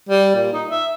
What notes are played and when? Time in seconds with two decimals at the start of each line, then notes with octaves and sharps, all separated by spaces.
0.09 G3
0.36 A#2
0.53 D#4
0.69 E5